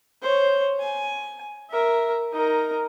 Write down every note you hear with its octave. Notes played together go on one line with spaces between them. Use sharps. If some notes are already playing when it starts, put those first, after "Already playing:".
C5 C#5
G#5
A#4 E5
D#4 A#4